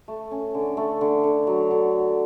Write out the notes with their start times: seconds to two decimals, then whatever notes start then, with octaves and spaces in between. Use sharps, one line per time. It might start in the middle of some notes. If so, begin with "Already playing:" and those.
0.08 A3
0.31 C#4
0.55 D3
0.77 A3
1.01 D3
1.24 D3
1.47 F#3
1.71 D3